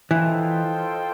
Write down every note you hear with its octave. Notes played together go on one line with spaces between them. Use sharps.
E3 F4 A4 C5 D#5 G5